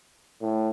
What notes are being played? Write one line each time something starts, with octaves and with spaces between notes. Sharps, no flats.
A2